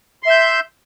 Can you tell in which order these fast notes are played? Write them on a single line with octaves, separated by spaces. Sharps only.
C6 E5 G6